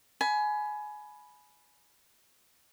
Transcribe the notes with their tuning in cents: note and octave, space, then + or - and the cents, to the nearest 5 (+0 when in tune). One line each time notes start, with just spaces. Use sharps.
G#5 +20 B5 +0